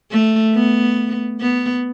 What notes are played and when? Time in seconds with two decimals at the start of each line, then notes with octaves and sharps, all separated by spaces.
0.11 A3
0.54 B3
1.41 B3